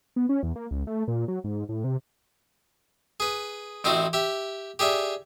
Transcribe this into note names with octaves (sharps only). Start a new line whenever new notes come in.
B3
C#4
E2
A#3
C#2
A3
A#2
F#3
G#2
A2
C3
G#4 B4
A1 C4 D#4 E4 F#4
G4 E5
G4 G#4 D5 E5